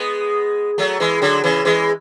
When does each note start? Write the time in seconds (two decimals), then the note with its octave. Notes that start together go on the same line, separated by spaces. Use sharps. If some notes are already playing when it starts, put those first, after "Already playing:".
Already playing: G#3 B3
0.78 F#3 A3
1.00 E3 G#3
1.22 D3 F#3
1.44 C#3 E3
1.65 E3 G#3